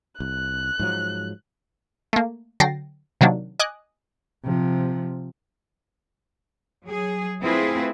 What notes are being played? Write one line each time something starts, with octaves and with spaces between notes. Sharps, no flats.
C2 F#6
G#2 F3 F#3
A3 A#3
D3 F#3 G5 A6 A#6 C7
C3 D#3 F#3 A#3 D4
D#5 G#5 D6 D#6 F#6
C3 F3
F#3 G#4
A3 C4 E4 F4 G#4 B4